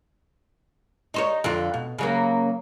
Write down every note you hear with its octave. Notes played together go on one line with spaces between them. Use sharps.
D#4 C5 C#5
F2 D3 F4
B2
C#3 F#3 A#3